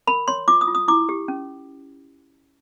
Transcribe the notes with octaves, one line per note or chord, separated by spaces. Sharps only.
A#4 B5
C#5 C6
F4 D6
D#6
F4
D#6
E4 D6
G4
C#4